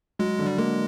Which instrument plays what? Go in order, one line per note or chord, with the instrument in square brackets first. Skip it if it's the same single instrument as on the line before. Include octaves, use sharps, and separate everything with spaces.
[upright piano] F#3 [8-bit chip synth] G#3
[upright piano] D3
[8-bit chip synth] G3
[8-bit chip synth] G#3 [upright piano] A#3